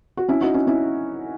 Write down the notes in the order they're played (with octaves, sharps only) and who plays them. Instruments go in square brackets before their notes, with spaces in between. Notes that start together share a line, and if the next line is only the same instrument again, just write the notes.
[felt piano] F#4
C#4 E4
D#4 F#4
C#4 E4
C#4 E4